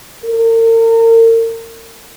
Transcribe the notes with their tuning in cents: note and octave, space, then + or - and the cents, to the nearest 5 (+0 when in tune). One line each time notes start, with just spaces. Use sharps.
A#4 -40